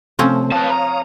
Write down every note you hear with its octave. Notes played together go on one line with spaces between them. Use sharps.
C3 F3 A3 C4 C#4
B4 C#5 F5 A5 D#6
A#5